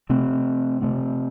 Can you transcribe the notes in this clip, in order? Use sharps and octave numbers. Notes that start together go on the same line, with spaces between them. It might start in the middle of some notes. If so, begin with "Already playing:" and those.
C3 A3 C4
C3 A3 C4